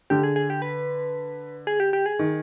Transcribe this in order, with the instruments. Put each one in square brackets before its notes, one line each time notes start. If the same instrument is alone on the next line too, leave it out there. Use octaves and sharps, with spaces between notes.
[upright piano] D3 [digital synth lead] G4
[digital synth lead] G#4
G#4
G4
B4
G#4
G4
G4
G#4
[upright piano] D#3